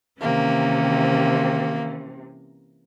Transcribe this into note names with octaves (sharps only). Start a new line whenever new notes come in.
C3 D#3 E3 A#3 C#4